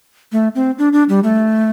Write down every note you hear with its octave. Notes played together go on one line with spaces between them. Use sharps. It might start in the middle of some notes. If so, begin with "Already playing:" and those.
A3
C4
D4
D4
G3
A3